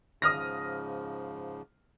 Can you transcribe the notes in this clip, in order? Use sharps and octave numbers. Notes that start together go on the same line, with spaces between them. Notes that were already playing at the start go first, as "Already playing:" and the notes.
G#2 C#3 F3 D#6 F6 A#6